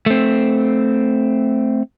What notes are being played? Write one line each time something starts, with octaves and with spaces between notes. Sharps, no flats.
A3 C4